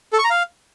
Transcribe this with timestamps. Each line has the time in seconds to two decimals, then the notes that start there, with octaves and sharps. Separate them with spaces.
0.13 A4
0.19 C#6
0.24 A#5
0.30 F5